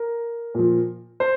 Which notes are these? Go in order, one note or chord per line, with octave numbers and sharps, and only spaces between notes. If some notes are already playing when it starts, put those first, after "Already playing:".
Already playing: A#4
A#2 F3
C5